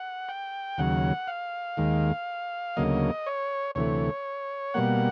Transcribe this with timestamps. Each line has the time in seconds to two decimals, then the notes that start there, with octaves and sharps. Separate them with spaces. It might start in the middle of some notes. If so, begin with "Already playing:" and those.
Already playing: F#5
0.29 G5
0.78 D#2 C#3 F#3 F#5
1.27 F5
1.77 D#2 D#3 G#3
2.77 D2 C#3 F#3 A#3 D#5
3.26 C#5
3.75 D2 C3 E3 A3 C#5
4.74 B2 G3 A#3 F#5